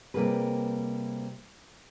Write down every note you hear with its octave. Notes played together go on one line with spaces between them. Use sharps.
C3 G3 A#3 F4 G#4 B4